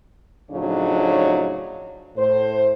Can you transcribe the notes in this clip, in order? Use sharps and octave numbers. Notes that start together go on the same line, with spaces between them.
A2 C#3 F3 F#3 D4 D#4
A2 C5